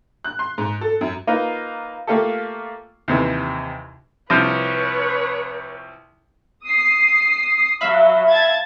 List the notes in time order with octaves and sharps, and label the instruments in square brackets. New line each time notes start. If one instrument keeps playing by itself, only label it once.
[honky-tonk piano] F#6
C6
G#2
A4
F#2
[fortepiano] A#3 D#4 F4 B4
A3 A#3 F4 G4 A4
D#2 C3 E3
[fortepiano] C2 C3 F3 [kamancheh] B4 C#5
[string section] D#6 C7
[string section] F#3 [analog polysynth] E5 F5 B5
[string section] A5 G#6 A6